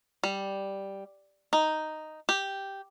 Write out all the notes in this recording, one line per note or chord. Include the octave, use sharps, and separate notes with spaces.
G3
D#4
G4